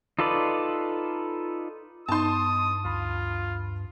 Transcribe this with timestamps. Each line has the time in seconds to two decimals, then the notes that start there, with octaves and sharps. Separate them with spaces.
0.19 D#4 F4 A4 B4 D5
2.09 G2 B3 D#4 A5 C6 D#6
2.85 D2 F4 B5